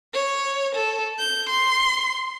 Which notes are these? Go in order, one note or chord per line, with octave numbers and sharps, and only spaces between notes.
C#5
A4
G6
C6